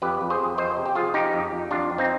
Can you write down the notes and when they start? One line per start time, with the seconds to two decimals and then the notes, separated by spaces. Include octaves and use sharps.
0.02 F2 G4 B4
0.21 F2
0.30 G#4 C5
0.40 F2
0.58 F2 C5 D#5
0.77 C3
0.86 G4
0.95 F3 F4 G#4
1.14 F3 D#4 G4
1.33 F2
1.52 F2
1.71 F2 D4 F4
1.90 F2
1.98 C4 D#4